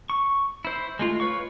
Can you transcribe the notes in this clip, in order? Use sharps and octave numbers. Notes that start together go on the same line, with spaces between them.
C#6
E4 C5
G#3 A3 F4
B4 C#5 F5 C#6